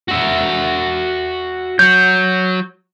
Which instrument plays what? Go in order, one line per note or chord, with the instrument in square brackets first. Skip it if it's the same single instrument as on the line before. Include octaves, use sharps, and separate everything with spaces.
[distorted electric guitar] F#4 E5
[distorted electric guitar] F#3 F#4 [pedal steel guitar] G6